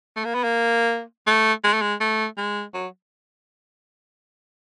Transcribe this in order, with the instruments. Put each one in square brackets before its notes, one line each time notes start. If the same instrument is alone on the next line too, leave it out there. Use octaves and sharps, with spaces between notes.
[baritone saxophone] A3
A#3
B3
A#3
A3
G#3
A3
G#3
A3
G#3
F#3